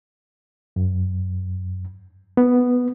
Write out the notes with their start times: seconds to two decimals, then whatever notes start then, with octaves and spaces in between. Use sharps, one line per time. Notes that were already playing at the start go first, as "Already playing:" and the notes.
0.76 F#2
2.37 B3